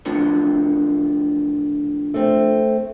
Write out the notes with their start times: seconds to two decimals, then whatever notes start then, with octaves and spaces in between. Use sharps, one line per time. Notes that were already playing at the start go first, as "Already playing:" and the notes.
0.06 A2 D3 F3
2.14 A3 C4